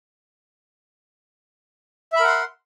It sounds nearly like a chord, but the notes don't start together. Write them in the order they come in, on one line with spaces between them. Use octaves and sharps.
E5 B5 A#4 F#5 C6